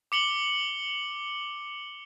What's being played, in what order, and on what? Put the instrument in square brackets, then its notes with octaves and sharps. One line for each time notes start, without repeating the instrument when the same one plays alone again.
[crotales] D6 C#7 F#7 G7